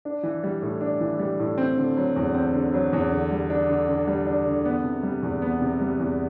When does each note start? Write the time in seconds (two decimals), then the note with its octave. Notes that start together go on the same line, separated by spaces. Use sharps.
0.05 D4
0.23 E3
0.44 G3
0.62 A2
0.81 D4
1.01 E3
1.19 G3
1.39 A2
1.58 C4
1.77 D3
1.97 F#3
2.16 E2
2.35 C4
2.54 D3
2.74 F#3
2.93 E2
3.12 D3
3.31 G3
3.50 D4
3.70 D3
3.89 D3
4.08 G3
4.27 D4
4.46 D3
4.65 B3
4.84 C3
5.03 G3
5.23 E2
5.42 B3
5.61 C3
5.81 G3
6.00 E2